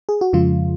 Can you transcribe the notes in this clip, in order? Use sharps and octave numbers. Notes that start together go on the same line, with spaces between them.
G#4
F#4
F2 C#3 F3 G#3 F4